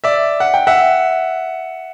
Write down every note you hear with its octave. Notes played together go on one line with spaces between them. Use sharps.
D5 E5
F#5
G5
E5 F#5